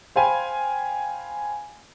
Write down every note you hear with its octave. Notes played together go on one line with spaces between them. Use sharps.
C5 F5 G5 G#5 B5